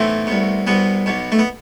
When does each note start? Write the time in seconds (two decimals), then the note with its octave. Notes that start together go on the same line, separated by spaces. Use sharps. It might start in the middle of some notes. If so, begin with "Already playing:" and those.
Already playing: B1 A2 E3 A3 C4
0.27 C2 B2
0.67 C2 B2 B3
1.06 B1 B2
1.32 A3
1.39 B3